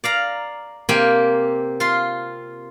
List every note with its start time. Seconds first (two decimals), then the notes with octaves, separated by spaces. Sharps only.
0.04 D5 F5 A#5
0.89 C3 A#3 C4 G4 G5 G#5
1.80 F4 C6